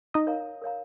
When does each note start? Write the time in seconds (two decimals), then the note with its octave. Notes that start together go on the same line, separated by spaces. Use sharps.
0.14 D#4 D#5
0.27 A#4 C#5 F5 A#5
0.62 A#4 C#5 F5 A#5